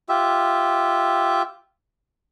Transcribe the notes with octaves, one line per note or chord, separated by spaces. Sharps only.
F4 G4 E5